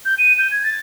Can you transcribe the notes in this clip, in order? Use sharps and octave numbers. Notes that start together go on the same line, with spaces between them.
G6
D#7
G6
G#6
A6